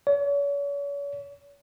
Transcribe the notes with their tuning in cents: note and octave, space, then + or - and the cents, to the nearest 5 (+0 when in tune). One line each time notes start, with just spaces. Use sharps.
C#5 +40